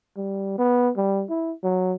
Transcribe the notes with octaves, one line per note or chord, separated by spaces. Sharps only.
G3
B3
G3
E4
F#3